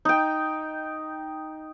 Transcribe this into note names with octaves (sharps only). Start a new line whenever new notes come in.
D#4 G5